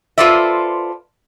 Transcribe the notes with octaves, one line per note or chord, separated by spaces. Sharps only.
F4 A4 B4 C5 D5 E5